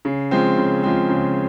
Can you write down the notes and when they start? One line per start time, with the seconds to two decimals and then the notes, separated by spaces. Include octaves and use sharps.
0.05 C#3
0.31 F3 G#3 C4
0.57 C#3
0.83 F3 G#3 C4
1.09 C#3